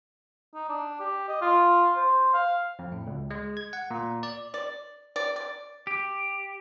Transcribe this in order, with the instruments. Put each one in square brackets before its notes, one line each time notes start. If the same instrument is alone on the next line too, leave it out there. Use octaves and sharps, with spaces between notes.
[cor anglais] D#4
D4
G4
D#5
F4
C5
F5
[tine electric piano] F2
A2
C#2
G#3
G#6
F#5
A#2
D5
[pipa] D5
D5
D5
[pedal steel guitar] G4